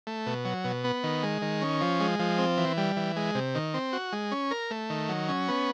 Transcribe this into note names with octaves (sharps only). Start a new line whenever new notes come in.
A3
B2
F#3
B2
B3
D#3
G#3
D#3
C#4
F3
G#3
F3
C4
E3
G3
E3
G#3
C3
D#3
C4
F#4
G#3
C#4
A#4
A3
D#3
F#3
C#4
B3